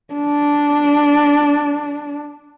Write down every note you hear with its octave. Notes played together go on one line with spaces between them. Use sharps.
D4